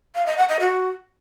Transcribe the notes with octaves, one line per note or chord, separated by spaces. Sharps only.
F5
D#5
F#5
D#5
F#4